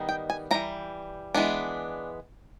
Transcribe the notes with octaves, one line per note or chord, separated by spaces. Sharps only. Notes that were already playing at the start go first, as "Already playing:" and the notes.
Already playing: D#3 G3 B3 D#4
G5
G#5
E3 G3 A#3 A#5
E3 G#3 B3 D4